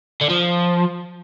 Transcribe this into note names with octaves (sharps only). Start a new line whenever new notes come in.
D3
F3